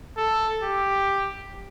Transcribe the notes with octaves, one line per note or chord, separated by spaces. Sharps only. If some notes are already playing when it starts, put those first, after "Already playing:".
A4
G4